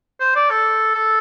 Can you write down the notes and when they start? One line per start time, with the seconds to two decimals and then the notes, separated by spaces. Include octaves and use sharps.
0.20 C5
0.36 D5
0.50 A4
0.95 A4